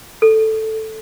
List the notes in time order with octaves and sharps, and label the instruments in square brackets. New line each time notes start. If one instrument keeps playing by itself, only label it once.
[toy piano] A4